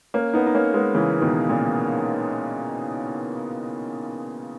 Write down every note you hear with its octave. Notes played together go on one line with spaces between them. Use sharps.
A#3 C#4
B3 D#4
D#4
A#3 C#4
G#3 B3
C#3 E3
B2 D#3
A#2 C#3